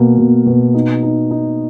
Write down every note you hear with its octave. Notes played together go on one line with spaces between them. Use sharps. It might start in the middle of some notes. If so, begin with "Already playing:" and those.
Already playing: B2 A#3
B2
B2
D#4
D#4
D#4